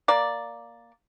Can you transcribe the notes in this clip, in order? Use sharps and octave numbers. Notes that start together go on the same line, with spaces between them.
A#3 D5